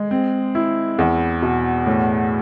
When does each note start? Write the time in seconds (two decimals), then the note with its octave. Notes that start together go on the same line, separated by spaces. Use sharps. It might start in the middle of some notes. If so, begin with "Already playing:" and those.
Already playing: G#3
0.11 C4
0.55 E4
0.99 E2
1.42 B2
1.86 A2